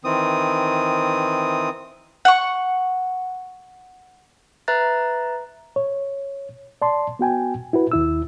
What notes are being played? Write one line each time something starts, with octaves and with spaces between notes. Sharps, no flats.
D#3 E3 C4 D#6
F#5 C#6
B4 E5 A#5 F#6 A6
C#5
D5 A5 C6
B3 F#4 G5 G#5
E4 F#4 B4
D#2 E4 E6